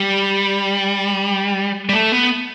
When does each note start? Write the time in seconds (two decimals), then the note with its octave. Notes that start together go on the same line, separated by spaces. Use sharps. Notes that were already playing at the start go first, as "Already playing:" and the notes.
Already playing: G3
1.89 G3
1.93 A3
2.12 B3